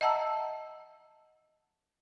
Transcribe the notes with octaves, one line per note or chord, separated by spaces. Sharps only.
D#5 E5 F#5 A5 A#5 E6